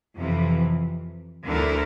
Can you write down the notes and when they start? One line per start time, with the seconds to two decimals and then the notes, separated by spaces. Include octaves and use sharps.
0.15 F2 C3 E3
1.45 D2 D3 A3 E4 A#4